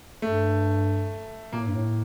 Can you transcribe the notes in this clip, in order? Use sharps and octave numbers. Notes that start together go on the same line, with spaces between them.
G2 A3
A#2 A#3
A2
G2
A2